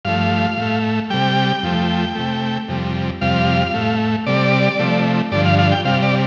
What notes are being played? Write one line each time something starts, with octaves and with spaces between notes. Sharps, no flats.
G2 F3 A3 F5
A2 A3
C3 G3 G5
F2 F3 A3
C3 A3
F2 C3 G3
F2 C3 G3 F5
A2 A3
C3 G3 D5
C3 F3 A3
G2 D3 F3 D5
F5
F5
G5
C3 G3 F5
D5